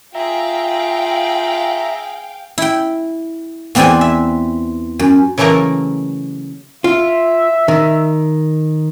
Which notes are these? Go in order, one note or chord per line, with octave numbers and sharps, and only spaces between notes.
F4 G#4 E5 F5 G5 A#5
E4 G5
E2 B3 C4 D5 G5 G#5
E5
F#2
C#3 E3 F#3 A3 A#3 A#4
F4 E5
D#3